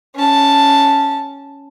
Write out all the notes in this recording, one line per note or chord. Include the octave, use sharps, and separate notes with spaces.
C#4 A5